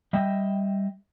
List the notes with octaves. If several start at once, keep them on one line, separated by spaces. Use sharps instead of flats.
G3 D#5 E5 G5